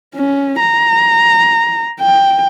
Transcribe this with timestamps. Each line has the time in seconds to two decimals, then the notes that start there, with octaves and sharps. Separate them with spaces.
0.15 C#4
0.60 A#5
2.01 G5